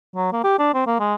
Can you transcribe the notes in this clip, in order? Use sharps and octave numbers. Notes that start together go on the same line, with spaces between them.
F#3
A#3
G4
D4
C4
A#3
G#3